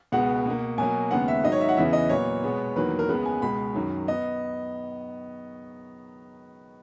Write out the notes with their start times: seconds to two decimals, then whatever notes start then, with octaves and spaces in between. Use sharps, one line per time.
0.12 C#2 B2 G#3 B3 F#5
0.46 B2 A#3
0.78 B2 F#3 A#3 G#5
1.11 D#2 C#3 G#3 B3 F#5
1.28 E5
1.44 G#2 D#3 F#3 D#5
1.52 C#5
1.61 E5
1.69 F#5
1.77 E2 C#3 E3 B3 E5
1.93 D#5
2.09 A#2 F#3 B3 C#5
2.43 B2 G#3 B3
2.76 E2 D#3 F#3 A#3 B4
2.99 A#4
3.09 C#2 C#3 G#3 B3 B4
3.25 G#5
3.42 C#2 B2 G#3 B5
3.75 F#2 D#3 F#3
4.08 B3 D#5